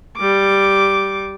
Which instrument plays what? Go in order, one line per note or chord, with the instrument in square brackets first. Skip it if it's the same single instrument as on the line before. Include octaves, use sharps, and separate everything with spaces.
[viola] G3 D6